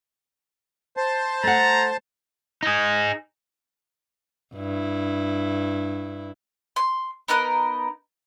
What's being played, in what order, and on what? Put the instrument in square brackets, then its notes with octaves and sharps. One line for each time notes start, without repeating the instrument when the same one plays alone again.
[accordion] C5 A5
[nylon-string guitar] A3 F#5 [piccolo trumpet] A#5 [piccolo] A6
[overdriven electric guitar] D#4 G#4
[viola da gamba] G2 E4
[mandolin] C6
B3 D#4 A#4 F#6